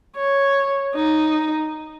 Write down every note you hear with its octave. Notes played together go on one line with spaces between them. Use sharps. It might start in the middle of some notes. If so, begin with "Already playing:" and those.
C#5
D#4